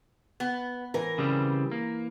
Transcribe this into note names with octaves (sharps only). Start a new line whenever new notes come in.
B3
E3 A#4
C#3 G3 C4
A#3